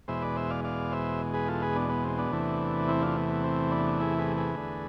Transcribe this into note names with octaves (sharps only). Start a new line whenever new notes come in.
E2 B2 G#3 C5 E5
B4 D5
C5 E5
D5 F5
D5 F5
C5 E5
G#4 B4
F4 A4
G#4 B4
B3 D4
B3
C4
B3 D4
E2 C3 E3 A3
C4 E4
D4 F4
B3
B3
C4
B3 D4
E4 G#4
G#4 B4
G#4 B4
E2 D3 A3